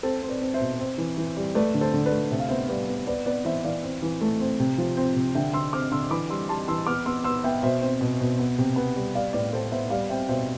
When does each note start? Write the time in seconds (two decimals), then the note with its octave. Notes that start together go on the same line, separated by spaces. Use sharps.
0.03 C4 A4 C5
0.22 C4
0.28 B4 D5
0.41 C4
0.54 C5 E5
0.61 B2
0.79 C4
0.98 E3
1.18 E3
1.37 G3
1.55 A3 B4 D5
1.74 D3
1.81 A4 C5
1.93 D3
2.05 B4 D5
2.12 A3
2.31 C3 E5
2.40 F5
2.49 B3 C5 E5
2.69 G3 B4 D5
2.88 B3
3.07 B3 B4 D5
3.26 B3 B4 D5
3.45 E3 C5 E5
3.64 E3 D5 F5
3.83 C4
4.02 E3
4.21 A3
4.40 C4
4.60 C3
4.78 F3
4.97 C4
5.16 C3
5.35 D3 E5 G5
5.53 D3 C6 E6
5.73 C4 D6 F6
5.92 D3 C6 E6
6.10 E3 B5 D6
6.30 G3 C6 E6
6.49 G3 A5 C6
6.68 E3 C6 E6
6.87 B3 D6 F6
7.06 B3 C6 E6
7.24 B3 C6 E6
7.44 B3 E5 G5
7.63 B2 C5 E5
7.82 C4
8.01 B2
8.20 B2
8.39 B3
8.58 C3
8.76 B3
8.96 G3
9.15 G3 D5 F5
9.33 A2 B4 D5
9.53 A2 A4 C5
9.71 B3 C5 E5
9.90 G3 D5 F5
10.09 C4 E5 G5
10.29 B2 C5 E5